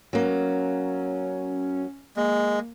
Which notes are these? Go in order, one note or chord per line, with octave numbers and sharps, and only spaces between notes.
F#3 A#3 C#4
G#3 A#3